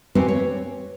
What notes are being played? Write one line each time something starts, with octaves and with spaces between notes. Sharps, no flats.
C4 C#4 G4 B4 C5
C#5